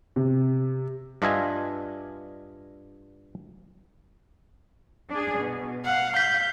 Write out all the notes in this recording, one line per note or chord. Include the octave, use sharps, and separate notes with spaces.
C3
G2 D4 F4 D#5 E5 G#5
D4 G#4
B2
F5 F#5
G6 B6